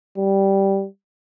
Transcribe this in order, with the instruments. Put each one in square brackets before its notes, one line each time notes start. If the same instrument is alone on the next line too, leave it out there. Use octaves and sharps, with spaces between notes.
[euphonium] G3